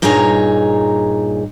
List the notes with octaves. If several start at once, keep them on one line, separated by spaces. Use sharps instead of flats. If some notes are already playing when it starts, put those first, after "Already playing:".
G2 A#2 D#4 G#4 C#5 A#5